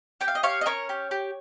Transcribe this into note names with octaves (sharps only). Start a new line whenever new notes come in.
G4 G5
F5
D#5
G4 C#5 F5
D#5
C#4 A#4 C#5
G4
G4